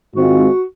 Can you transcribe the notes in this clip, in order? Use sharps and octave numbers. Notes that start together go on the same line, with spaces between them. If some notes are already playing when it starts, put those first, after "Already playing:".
G#2 D#3 G#3 C4 F4 F#4